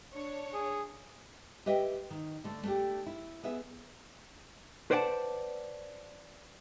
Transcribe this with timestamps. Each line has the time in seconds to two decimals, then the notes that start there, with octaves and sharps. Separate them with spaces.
0.12 D4 C#5
0.54 G#4
1.66 G4 B4 D#5 E5 G5
2.10 D#3
2.44 D3 A3
2.64 A3 D4 G4
3.06 E4
3.43 B3 G#4 E5
4.91 B4 C5 D5 F#5 G5 A5